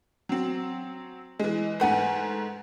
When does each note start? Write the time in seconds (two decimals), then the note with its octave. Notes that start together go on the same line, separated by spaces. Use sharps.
0.29 F#3 C4
1.40 E3 G#3
1.80 G#2 A3 B4 F#5 G#5